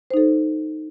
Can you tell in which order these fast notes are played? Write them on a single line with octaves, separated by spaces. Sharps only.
C5 D#4 A4